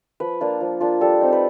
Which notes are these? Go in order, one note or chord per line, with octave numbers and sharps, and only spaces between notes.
F3 B4
A#3 D4 F4
F3
A#3 D4 F4
G3 A4
C4 D#4
B4